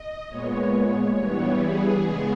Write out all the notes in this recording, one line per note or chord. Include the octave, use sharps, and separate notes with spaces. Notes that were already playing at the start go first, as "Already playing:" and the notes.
Already playing: D#5
A#2 G#3 B3 C#5
G2 E3 G3 B3 C#5
G#4
C#3 G#3 B3